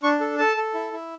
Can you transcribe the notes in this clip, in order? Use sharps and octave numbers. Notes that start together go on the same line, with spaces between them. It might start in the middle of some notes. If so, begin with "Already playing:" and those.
D4 C#6
A4
A4 A5
A4
E4
E4